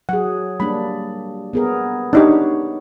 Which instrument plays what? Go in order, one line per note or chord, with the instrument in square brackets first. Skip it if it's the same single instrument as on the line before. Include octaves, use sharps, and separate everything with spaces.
[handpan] F#3 G#4 [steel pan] F#5
[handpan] G3 A#3 D4 [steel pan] B5
[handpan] B3 G#4 A#4
[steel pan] D4 D#4 G4 [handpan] C#5